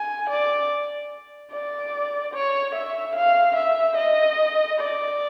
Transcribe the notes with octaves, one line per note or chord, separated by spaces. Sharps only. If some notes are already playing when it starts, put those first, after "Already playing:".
Already playing: G#5
D5
D5
C#5
E5
F5
E5
D#5
D5